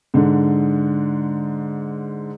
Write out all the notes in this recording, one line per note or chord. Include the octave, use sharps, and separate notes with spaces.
G#2 D3